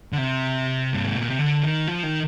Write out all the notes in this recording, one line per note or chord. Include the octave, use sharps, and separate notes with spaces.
D3
C3
G2
G#2
A#2
C3
D3
D#3
F3
D#3